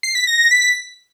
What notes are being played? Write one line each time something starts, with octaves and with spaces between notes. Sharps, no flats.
C7
B6
A#6
A#6
B6